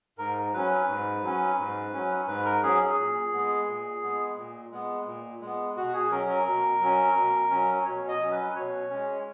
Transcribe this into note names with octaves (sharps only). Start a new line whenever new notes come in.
G#2 A#4
F#3 C#4 B4
B4
G#2
F#3 C#4
G#2
F#3 C#4
G#2 B4
A#4
F#3 C#4 G#4
G#4
A#2
G#3 B3
A#2
G#3 B3
A#2
G#3 B3
A#2
G#3 B3
B2 F#4
G#4
F#3 C#4 A#4
A#4
B2
F#3 C#4
B2
F#3 C#4
B2 C#5
D#5
F#3 C#4
B4
B2 C#5
G#3 C#4